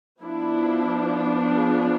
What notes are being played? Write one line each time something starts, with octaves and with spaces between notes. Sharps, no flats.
F3 B3 D4 E4
G#4